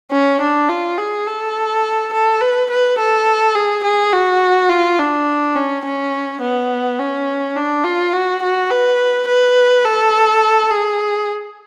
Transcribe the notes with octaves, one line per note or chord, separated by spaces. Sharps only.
C#4
D4
F4
G#4
A4
A4
B4
B4
A4
G#4
G#4
F#4
F4
D4
C#4
C#4
B3
C#4
D4
F4
F#4
F#4
B4
B4
A4
G#4